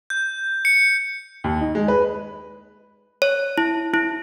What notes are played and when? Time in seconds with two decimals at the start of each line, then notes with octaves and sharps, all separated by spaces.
0.10 G6
0.65 C#7
1.44 D#2
1.61 D#4
1.75 G#3
1.88 B4
3.22 C#5
3.58 E4
3.94 E4